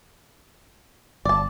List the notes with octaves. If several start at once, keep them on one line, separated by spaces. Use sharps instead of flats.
G1 D5 A5